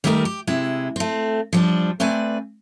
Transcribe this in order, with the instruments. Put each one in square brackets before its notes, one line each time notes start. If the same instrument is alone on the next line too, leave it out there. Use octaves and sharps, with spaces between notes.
[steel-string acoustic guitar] D#3 G3 A3 D#4 G4 A#4
G4
C3 G#3 E4
A3 C4
F3 G3 D4
A3 C4 B4 D5 G#5